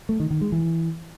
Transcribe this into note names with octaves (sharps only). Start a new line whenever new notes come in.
A3
D#3
D#3
G#3
E3